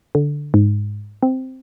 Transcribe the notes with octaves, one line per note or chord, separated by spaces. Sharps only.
D3
G#2
C4